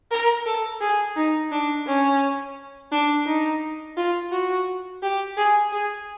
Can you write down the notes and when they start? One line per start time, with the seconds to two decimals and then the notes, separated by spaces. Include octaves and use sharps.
0.11 A#4
0.46 A4
0.81 G#4
1.16 D#4
1.52 D4
1.86 C#4
2.92 D4
3.27 D#4
3.97 F4
4.32 F#4
5.03 G4
5.37 G#4
5.73 G#4